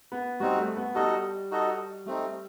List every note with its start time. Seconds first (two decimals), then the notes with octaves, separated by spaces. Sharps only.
0.12 B3
0.40 G3 C4 D#4 F#4
0.58 A3
0.77 B3
0.95 G3 D#4 F#4 A4 D#5
1.51 D#4 F#4 A4 D#5
2.06 G3 A3 C4 D#4